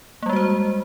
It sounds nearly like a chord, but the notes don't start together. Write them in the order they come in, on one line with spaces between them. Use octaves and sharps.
A#3 G3 G#3 F#4 C5